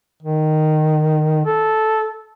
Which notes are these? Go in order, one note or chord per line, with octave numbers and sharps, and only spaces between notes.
D#3
A4